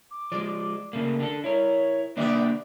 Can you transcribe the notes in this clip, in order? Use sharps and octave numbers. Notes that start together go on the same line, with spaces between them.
D6
F3 G#3 D5
C#3 A3 A#3 A#4
D4 G4 A4
E4 A#4 C#5
D#3 A#3 B3 D4 G4 D5 E5